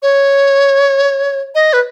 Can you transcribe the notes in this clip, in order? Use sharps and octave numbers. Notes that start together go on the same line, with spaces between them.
C#5
D#5
B4